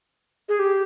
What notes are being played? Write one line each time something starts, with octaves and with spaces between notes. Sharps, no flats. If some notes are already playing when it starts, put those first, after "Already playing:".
G#4
G4